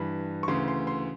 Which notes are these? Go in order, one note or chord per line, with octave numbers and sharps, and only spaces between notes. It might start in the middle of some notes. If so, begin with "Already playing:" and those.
Already playing: G2 E3 B5
C#6
D2 C#3 E3 C6
C6
C6